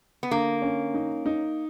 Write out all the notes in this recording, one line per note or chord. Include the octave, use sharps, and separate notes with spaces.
B3
D3 A#3
C#4
D#4
D#4